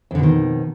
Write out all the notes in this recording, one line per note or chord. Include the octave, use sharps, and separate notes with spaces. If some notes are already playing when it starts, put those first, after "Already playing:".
F2 B2 D3 D#3